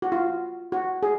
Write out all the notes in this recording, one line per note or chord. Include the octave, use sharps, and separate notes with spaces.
F#4
F4
F#4
G#4